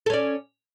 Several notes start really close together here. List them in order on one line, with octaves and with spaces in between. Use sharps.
A4 C#4 D5